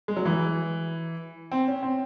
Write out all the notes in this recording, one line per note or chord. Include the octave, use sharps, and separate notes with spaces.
G#3
F#3
E3
C4
C#4
C4